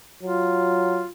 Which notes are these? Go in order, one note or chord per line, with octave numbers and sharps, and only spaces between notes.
F#3 F4